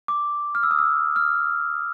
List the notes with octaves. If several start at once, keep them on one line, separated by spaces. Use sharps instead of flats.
D6
F6
E6
D#6
E6
F6